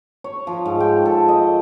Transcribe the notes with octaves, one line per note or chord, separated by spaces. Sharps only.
C#5
F3
G#2
G5
A4
D#5